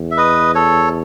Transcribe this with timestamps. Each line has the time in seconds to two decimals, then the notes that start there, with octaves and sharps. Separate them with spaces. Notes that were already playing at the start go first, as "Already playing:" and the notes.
Already playing: E2
0.11 E5
0.17 B4 D#5
0.55 A4 C#5